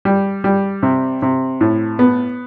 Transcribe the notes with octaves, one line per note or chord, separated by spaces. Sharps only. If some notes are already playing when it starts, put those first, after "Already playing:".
G3
G3
C3
C3
A2
B3